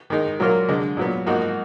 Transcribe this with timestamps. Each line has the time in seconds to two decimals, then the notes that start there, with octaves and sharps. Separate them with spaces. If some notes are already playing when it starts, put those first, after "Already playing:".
0.10 D#3 G#3 D#4
0.40 A#2 F#3 A#3 F4 A#4
0.69 D3 G#3 D4
0.97 A#2 F#3 B3
1.26 G#2 F3 A#3 D#4 F#4